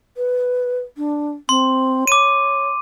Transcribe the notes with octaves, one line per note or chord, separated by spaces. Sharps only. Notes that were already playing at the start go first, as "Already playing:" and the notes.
B4
D4
C4 C6
C#5 D6 D#7